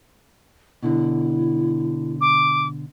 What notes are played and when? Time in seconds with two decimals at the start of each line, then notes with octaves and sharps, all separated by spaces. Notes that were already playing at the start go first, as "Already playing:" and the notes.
0.83 B2 D3 E4
2.21 D6